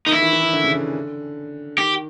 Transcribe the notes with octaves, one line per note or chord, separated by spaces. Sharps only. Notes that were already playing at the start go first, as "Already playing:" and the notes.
D#3 D#4
E3 E4
D#3
E3
E3
D#3
D3
C#3
D3
D#3 G4